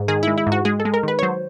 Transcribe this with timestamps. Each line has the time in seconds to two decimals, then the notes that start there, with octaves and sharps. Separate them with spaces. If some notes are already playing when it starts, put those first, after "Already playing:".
Already playing: G#2
0.08 D#3 G#4
0.23 G#3 E4
0.38 E4
0.47 G#2
0.52 F#4
0.65 G#3 G#4
0.80 A4
0.85 G#3
0.94 A#4
1.03 D#3 B4
1.19 C#5
1.23 F#3 C5